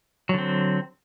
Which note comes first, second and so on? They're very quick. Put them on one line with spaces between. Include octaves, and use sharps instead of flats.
F#3 D3 C4